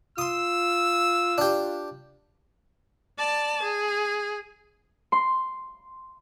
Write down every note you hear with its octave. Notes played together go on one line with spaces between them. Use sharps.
F4 C6 D#6 E6
D4 G4
D5 A5
G#4
C6